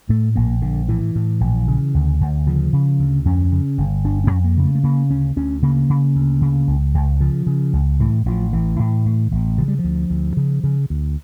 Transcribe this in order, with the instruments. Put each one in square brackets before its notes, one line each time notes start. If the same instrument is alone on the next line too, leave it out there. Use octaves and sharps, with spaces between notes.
[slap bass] A2 A3
A#1 A#3
A#1 D3
A2 E3
A2
A#1
C#3
D2
D2
C#3 F3
C#3
D2
F2 C#4
C#3
G1
G1 D4
C#4
F2
A#3
C#3
A3
A3
C#3 A#3
D2 C#4
D2 C#4
C#3 A#3
C#3
D2
C#3
C#2
C#2
C#3 F3
C#3
C#2
A2 E3
A1 F3
A1 E3
A2
A2
A1
C#3 F3
G3
F3
D2
D2
C#3
C#3
D2